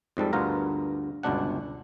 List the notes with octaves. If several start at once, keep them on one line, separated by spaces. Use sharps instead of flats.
F2 G#2 G3 A4
D2 G2 B3 F4 A#4 A#5
G1 C#2 B2 D4 F#5